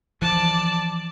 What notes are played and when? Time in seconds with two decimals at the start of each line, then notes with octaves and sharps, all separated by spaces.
0.22 E3 F3 D5 A5